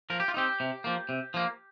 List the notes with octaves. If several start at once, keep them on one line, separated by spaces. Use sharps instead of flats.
F3 A#4
G4
F4
C4 D#4 G4
C3
F3 A#3
C3
F3 A#3